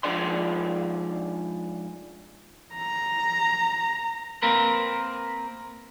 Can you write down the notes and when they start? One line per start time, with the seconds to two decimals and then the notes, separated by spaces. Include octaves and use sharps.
0.03 G#2 F3 D4 G#4 D5 C6
2.74 A#5
4.42 A#3 C4 A#4 B4